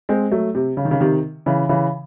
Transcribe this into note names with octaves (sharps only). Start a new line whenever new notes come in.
G#3 C4
F#3 A3
C3
C#3
D#3
C#3
C3 D#3
C#3 E3
C#3 E3